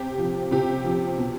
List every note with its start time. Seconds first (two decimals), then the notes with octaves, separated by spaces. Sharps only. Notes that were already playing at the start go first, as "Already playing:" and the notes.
Already playing: C3 G4
0.18 F3
0.51 C3 G4
0.84 F3
1.18 B2